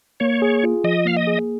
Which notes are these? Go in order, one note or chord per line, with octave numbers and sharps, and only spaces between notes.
A#3 C#5
G#4
F4
F3 D#5
A#3 F5
D#5
G#4